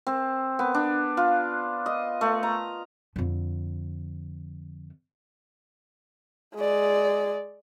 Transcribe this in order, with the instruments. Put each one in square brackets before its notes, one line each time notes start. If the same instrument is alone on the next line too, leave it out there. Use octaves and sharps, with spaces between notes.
[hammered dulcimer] C4
B3
D4
F4
D#5
A3
A#5
[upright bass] F2 D3
[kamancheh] G#3 D5